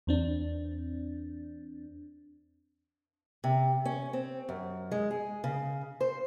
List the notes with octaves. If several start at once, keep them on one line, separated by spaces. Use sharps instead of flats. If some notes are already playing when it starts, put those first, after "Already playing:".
E2 C4 D4
C3
C#4
C4
F#2
G#3
G#4
C#3
C5